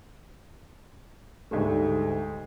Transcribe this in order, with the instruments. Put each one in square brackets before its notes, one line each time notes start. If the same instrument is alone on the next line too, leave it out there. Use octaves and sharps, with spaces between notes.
[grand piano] D2 G#2 G3 A3